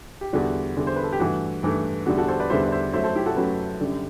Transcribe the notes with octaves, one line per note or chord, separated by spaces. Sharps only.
G4
E2 D3 G3 F#4
E2 D3 G3
C5
B4
A4
G4
G2 E3 A3 F#4
G2 E3 A3
E2 D3 G3 F#4
F#4 A4
A4 C5
B4 D5
E2 D3 G3 C5 E5
D5
C5 E5
F#2 F#3 A3 C5 E5
A4 C5
E4 G4
F#4 A4
F#2 F#3 A3 G4 B4
F#2 D3 G3